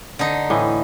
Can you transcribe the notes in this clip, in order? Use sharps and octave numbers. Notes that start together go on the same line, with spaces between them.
D3 D#4
A2 E3